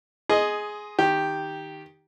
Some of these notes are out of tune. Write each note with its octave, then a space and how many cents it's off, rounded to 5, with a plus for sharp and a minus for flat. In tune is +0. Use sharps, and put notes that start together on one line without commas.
G#4 +10 D#5 +0 C6 +0
D#3 +0 G4 +0